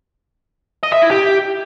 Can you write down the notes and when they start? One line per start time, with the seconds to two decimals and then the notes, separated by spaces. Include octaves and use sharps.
0.83 D#5
0.93 E5
1.02 E4
1.11 G4